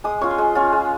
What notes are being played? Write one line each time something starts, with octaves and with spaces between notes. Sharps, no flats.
G#3 D#6
C#4 F4 C#6
C6
G#3
C#4 F4
G#3